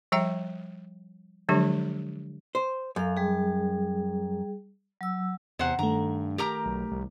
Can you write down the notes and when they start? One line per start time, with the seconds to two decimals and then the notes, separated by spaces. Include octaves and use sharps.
0.12 F3 G3 E5 G5 A#5
1.49 D3 F3 F#3 G#3 D4 G4
2.55 C5
2.96 F#2 A4 F5
3.17 G3 G#4
5.01 F#3 E6
5.59 E2 C3 C5 F#5
5.79 G2 D#3 A3 A#5
6.38 G4 A#4 A#5
6.66 B1
6.92 C2